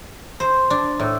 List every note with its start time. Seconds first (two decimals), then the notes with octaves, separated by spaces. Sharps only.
0.40 C5
0.70 D4
1.00 A2